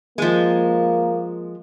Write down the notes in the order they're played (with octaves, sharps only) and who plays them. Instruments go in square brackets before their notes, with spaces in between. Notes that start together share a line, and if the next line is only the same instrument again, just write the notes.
[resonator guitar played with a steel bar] F3 G#3 [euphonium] A#3